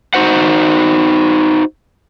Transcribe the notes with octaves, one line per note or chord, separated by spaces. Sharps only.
D#4 E4 F#4 C5 F#5